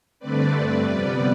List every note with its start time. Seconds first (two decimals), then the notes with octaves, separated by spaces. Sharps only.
0.20 G2 D3 A3 C4 B4 D5
0.84 F2 C3 G3 B3